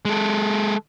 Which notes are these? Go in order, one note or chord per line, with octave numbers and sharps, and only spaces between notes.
G#3 A4